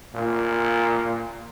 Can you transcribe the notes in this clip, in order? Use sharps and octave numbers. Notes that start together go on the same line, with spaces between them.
A#2